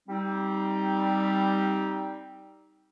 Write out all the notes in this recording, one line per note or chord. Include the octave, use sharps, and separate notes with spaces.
G3 C4 D#4